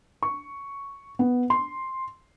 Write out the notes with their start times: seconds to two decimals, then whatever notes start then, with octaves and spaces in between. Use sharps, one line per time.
0.23 C#6
1.19 B3
1.50 C6